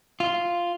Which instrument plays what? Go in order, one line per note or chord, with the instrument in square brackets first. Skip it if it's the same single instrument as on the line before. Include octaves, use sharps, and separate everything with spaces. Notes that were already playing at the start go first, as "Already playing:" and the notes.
[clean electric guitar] F4